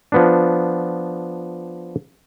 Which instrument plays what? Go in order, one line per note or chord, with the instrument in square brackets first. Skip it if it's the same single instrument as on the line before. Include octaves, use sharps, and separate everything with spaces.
[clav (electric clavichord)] F3 B3 D4